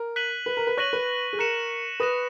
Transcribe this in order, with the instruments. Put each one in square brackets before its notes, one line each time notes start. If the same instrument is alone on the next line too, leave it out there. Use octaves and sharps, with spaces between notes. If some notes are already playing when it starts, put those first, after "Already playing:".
Already playing: [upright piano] A#4
[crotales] F#6 B6 D#7 F#7
[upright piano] B4
A#4
B4
[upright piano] C#5 [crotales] C#6 F#6 A#6 D#7 F#7
[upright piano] B4
G#4
[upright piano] A#4 [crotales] F#6 C#7 E7
[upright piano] B4 [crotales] D#6 A#6 E7